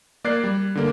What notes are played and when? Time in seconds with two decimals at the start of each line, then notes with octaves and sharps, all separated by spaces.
0.24 A#3 D5 F#6 G#6 C7
0.44 G3
0.75 D3 A#3